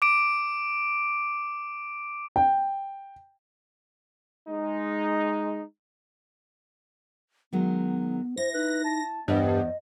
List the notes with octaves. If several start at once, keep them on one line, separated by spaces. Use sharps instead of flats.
D6 D7
G5
G#3 D#4
D#3 F#3 G#3 B3
E4 C5 A#6
D#4 B4
A5
E2 G2 B3 C5 D5 D#5